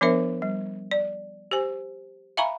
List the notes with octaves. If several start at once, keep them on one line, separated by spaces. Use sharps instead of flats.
F3 B3 D4 A#4 C5 E5
G3
D5
G4 C5 G#5
E5 F5 G#5 A#5 B5 C#6